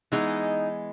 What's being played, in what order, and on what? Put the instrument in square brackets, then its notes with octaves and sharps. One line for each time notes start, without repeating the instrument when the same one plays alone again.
[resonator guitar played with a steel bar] E3 G#3 B3 D#4